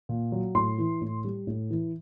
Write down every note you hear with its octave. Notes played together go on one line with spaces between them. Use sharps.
A#2
F#3
A2 C6
E3
A2
G3
A2
E3